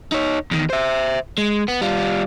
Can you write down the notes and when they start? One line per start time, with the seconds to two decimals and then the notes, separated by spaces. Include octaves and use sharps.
0.12 D#4 C#5
0.51 E2 D#3
0.70 C5 E5
1.38 G#3
1.68 B3
1.81 G3 F4